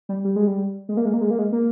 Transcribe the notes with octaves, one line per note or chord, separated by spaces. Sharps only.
G3
G3
G#3
G3
G#3
A#3
G#3
A#3
G#3
A#3
G#3
A#3